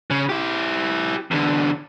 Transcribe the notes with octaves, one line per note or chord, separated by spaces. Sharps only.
C#3
E4 G4
E2 D3